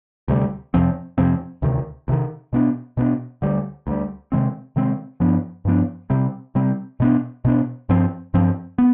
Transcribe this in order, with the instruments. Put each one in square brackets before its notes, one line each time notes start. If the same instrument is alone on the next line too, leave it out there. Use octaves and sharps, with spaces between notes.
[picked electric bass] D2 C3 G3
F2 C3 F3 C4
F2 C3 F3 C4
D2 C3 D#3
D2 C3 D#3
B2 B3 D4
B2 B3 D4
D2 D3 G3
D2 D3 G3
C3 D#3 G#3 C4
C3 D#3 G#3 C4
G2 F3 B3 D4
G2 F3 B3 D4
C3 G3 C4
C3 G3 C4
B2 B3 D4
B2 B3 D4
G2 F3 C4
G2 F3 C4
B3